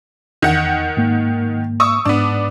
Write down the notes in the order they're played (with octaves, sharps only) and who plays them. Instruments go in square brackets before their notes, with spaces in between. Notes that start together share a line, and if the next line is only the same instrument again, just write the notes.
[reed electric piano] E2 [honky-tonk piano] D#3 F#5
[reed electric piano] G#2 A#3
[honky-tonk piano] C#6 D#6 E6
[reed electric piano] G#2 [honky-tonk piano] B3 D4